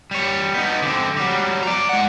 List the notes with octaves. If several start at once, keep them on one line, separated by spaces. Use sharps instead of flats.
G3 C#5
B3 D#4
D3 C4
F#3 G3
D5 A#5
G#3 F#5